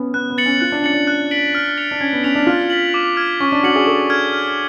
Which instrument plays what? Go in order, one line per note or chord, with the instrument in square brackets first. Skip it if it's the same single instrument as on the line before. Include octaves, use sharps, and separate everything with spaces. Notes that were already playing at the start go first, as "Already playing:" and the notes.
Already playing: [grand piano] B3 C#4
[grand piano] B3 [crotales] F#6
[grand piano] B3
[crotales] A6 C#7 F#7
[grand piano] C#4
[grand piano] F4 [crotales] F#6
[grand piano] D4
[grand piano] C#4 [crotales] A6 C#7 F#7
[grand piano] D4
[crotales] F#6
B6 D7 F#7
F6
A6 C#7 F7
[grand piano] D4
[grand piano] C#4 [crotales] G#6
[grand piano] B3
[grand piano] C#4 [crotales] B6 D7 F7
[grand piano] D4
[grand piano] F4 [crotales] F6
[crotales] B6 F#7
D6
F6 G#6
[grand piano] C#4 [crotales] C#6
[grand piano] D4
[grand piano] F#4 [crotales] F6 G#6 C#7 F#7
[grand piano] G#4
[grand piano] A4 [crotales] C#6
[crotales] F6 G#6
F6